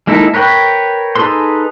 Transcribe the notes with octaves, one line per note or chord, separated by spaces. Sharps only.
G#3 A#3 D#4 E4 A4
A#4 B4 C#5 G5 B5
D#4 G#4 A4 B4 C6